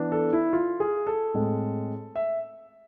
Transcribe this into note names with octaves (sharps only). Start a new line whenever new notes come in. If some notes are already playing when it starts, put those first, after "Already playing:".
Already playing: E3 B3 D4
A4
E4
F4
G#4
A4
A2 G#3 C4
E5